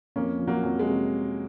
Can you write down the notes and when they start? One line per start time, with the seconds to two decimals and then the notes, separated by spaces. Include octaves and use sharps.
0.16 F2 A#3 C#4
0.39 F3
0.47 F#3 A#3
0.63 F2
0.79 G#3
0.86 C3